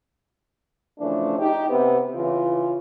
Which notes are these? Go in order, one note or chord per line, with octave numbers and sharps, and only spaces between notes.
C#3 E3 F3 A3 C#4 D4
D#4 G4
C3 B3 G4
C#3 E3 F4